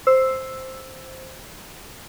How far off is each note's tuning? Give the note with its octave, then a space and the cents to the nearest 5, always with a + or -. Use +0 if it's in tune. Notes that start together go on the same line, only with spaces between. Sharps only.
C5 +0 E6 +0